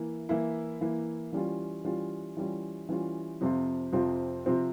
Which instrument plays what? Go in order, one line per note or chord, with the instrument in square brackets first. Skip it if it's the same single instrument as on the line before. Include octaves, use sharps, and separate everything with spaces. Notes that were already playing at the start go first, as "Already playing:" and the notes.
Already playing: [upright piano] E3 A#3 E4
E3 A#3 E4
E3 A#3 E4
E3 G3 C#4 F4
E3 G3 C#4 F4
E3 G3 C#4 F4
E3 G3 C#4 F4
F2 C3 F3 C4 F4
F2 C3 F3 C4 F4
C3 F3 C4 F4